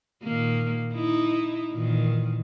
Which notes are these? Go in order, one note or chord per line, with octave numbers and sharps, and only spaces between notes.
A#2 D#3 A#3
D#4 E4
A#2 D#3 E3